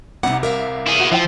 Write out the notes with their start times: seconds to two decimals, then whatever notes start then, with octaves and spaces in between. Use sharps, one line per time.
0.23 C2 C3 D#4 F#5
0.43 A#4 E5 F5
0.87 E4 G#4
1.00 F#4
1.12 F3 E4 C5 G5